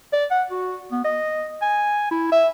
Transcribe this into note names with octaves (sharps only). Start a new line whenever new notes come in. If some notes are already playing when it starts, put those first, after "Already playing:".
D5
F#5
F#4
B3
D#5
G#5
E4
E5